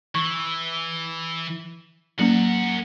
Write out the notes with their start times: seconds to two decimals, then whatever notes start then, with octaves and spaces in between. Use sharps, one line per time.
0.15 E3 C#6
2.19 F#3 A#3 C#4 A#4 F#5